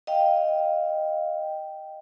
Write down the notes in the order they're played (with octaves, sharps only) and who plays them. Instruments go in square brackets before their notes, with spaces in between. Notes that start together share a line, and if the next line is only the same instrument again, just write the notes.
[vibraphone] D#5 F5 G5